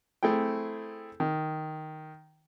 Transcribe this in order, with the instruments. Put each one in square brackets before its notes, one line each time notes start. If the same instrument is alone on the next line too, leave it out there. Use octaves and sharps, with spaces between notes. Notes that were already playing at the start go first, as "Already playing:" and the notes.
[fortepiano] A3 C4 E4 G#4 G5
D#3